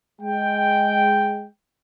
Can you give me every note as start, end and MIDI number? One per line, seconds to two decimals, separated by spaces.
0.22 1.47 56
0.22 1.47 79